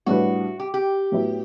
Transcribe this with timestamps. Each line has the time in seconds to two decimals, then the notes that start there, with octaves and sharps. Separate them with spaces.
0.06 A2 G3 D4 F#4 G4 B4
0.60 G4
0.74 G4
1.12 A2 F#3 B3 E4